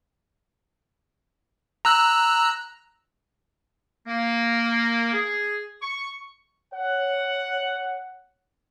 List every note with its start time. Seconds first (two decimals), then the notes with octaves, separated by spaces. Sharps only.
1.85 A#5 E6 F#6
4.07 A#3
5.12 G#4
5.82 C#6
6.74 C#5 F#5